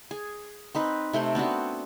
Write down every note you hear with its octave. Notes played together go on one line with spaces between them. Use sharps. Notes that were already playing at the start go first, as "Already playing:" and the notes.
G#4
C4 D#4 B4
C3 A3 G5 C6
B3 C4 D4 F#4